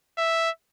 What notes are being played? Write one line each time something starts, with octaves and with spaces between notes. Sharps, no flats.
E5